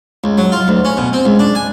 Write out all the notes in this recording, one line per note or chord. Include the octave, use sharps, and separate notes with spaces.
C#2
F#3
F4
D2
C#4
B2
C4
C#2
D4
G#5